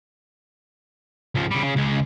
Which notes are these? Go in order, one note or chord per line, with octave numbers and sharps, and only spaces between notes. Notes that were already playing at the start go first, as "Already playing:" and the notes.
C#2 F3
C#3 G3
C#3
C#2 G#3